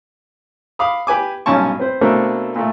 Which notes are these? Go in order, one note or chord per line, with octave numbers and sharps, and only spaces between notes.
F5 B5 D6 D#6
G4 B4 G#5 D6
B1 G2 A#2 C#4 A5 C#6
C4 B4 C5
B2 A3 A#3 C4 D4 A4
A#2 A3